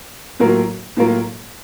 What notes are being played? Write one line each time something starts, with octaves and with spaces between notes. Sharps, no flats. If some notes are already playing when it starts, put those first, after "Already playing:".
A2 F#3 A#3 F4 A#4
A2 F#3 A#3 F4 A#4